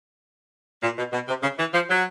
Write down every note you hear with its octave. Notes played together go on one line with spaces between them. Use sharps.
A#2
B2
B2
C3
C#3
E3
F3
F#3